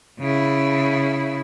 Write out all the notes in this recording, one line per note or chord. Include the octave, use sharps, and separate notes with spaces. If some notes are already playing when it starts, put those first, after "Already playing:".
C#3 E4